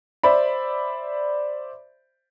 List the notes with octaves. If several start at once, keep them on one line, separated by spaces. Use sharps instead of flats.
C5 D5 E5 B5